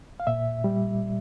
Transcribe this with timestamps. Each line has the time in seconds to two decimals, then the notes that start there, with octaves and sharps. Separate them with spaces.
0.20 F5
0.27 A#2 E5
0.64 G3